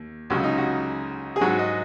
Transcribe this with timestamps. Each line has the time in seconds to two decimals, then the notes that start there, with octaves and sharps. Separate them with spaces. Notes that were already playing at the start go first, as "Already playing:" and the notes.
Already playing: D#2
0.30 C#2 C#3 F#3 F#4
0.44 D#4
0.58 F#4
1.36 G#4
1.41 G#2 F#3 F#4
1.59 D#5